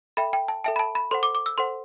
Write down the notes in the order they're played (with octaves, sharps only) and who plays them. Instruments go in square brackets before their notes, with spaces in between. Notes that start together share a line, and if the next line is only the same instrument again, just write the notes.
[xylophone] A4 E5 G5 B5
G5
A5
A4 E5 G5 A5
B5
A5
B5
A4 C5 F#5 C6
D6
D6
E6
A4 C5 F#5 C6